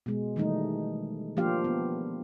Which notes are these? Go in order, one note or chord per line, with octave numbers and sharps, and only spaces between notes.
B2 G#3
D#3 E3 G3 A3 D#4
F3 A#3 D4 F4 G4 F5
B3